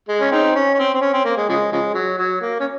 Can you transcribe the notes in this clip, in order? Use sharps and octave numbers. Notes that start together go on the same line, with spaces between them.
G#3
C#4
C4 D#4
C#4
C#4
C4
C4
C#4
C4
A#3
G#3
C#3 F3 G#3
C#3 F3 G#3
F#3
F#3
A#3
C#4